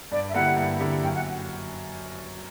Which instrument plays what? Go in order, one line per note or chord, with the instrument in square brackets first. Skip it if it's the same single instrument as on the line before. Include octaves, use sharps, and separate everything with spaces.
[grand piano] G2 [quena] D5
[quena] E5
[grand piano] D3 A#3 E4 G4 [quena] F#5
[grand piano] G2
D3 A#3 E4 G4
[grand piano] F#2 [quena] G5
[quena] F#5